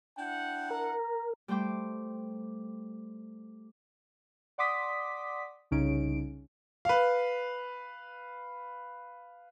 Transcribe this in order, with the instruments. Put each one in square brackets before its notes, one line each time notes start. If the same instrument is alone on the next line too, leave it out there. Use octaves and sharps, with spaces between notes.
[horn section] D4 E4 F#5 [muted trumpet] G5
[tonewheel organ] A#4 [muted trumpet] A#5
[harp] G3 A3 C5 G5 D6
[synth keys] D5 F#5 C6 D6 D#6 B6
C2 C#3 C#4 D#4 D7
[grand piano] B4 F5